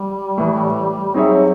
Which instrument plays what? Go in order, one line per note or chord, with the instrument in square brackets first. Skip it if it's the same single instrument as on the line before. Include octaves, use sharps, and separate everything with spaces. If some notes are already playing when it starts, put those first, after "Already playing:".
Already playing: [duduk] G3
[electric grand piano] A2 E3 A3
[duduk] F#3 [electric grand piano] C4 D#4 G#4 C#5 E5